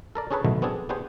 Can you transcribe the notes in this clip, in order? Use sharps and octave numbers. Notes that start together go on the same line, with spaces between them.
A4 A#4 D5
C#4 D4 G#4 A4 B4 C#5
B1 B2 D3 D#3 A3
B3 C4 D4 G#4 A4
B3 D4 G4 G#4 C5